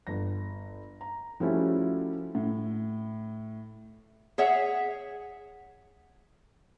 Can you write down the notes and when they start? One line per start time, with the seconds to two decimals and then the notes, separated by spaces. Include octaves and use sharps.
0.07 G1 A#6
1.01 A#5
1.40 F3 G3 A3 C#4 E4 F#4
2.35 A2
4.38 G#4 C#5 E5 F#5